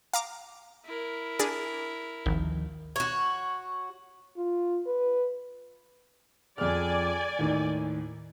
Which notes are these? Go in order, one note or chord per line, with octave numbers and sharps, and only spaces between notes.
F5 A#5 D6
E4 A#4
D4 G#4 D5
G#1 D2 D#3 F3
F#4 C#5
F4
B4
F2 G#4 D5 G#5 F6
D#2 A2 D#3